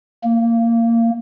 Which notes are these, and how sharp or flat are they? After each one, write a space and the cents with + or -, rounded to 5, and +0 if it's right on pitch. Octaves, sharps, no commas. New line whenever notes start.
A#3 -15